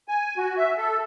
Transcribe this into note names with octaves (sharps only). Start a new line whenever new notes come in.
G#5
F#4
E5
A4